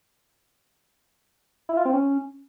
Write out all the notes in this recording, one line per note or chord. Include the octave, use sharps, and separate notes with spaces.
E4
F4
C4
C#4